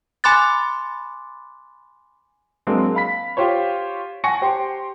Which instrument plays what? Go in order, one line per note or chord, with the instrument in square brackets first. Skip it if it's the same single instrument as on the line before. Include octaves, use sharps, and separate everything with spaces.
[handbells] G#5 B5 C6 D6 F#6 A6
[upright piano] F#3 G#3 A#3 C4 D4
F5 B5 B6
F4 G4 C5 C#5
F#5 G#5 A5 C#6 A#6 C#7
G4 C5 G5 C6